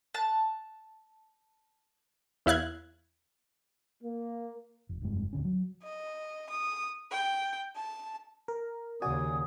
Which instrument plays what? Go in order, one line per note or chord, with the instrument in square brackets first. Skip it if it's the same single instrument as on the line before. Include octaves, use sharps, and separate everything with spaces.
[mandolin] A5 F#6
[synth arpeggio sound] E2 E4 F5 F#6 G#6
[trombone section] A#3
[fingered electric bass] F1
F1 G2 G#3
D1 G1 D3 C#4
F#3
[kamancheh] D#5
D#6
G5
A5
[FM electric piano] A#4
[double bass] D#2 C#3 [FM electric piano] F#4 D5 G#5 [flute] D#6